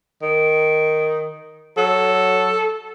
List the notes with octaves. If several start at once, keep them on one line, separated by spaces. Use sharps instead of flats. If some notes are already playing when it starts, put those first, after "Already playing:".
D#3
F#3 A4